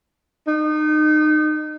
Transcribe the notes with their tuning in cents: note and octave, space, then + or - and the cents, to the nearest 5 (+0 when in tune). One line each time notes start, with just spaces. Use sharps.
D#4 -30